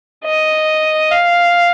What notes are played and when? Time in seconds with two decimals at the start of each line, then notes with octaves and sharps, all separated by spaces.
0.24 D#5
1.11 F5